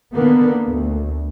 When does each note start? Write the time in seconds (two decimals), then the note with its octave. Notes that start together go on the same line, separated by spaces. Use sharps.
0.13 D3 D#3 A#3 B3
0.66 D2